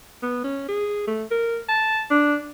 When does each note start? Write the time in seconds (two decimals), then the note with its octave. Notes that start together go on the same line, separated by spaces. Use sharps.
0.22 B3
0.44 C#4
0.68 G#4
1.07 A3
1.31 A#4
1.69 A5
2.11 D4